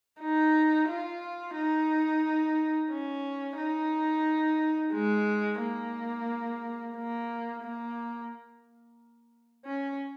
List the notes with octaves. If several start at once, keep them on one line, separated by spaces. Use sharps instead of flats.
D#4
F4
D#4
C#4
D#4
G#3
A#3
A#3
A#3
C#4